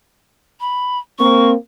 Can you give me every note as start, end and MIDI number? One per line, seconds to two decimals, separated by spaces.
0.60 0.98 83
1.19 1.53 58
1.19 1.53 60
1.19 1.50 85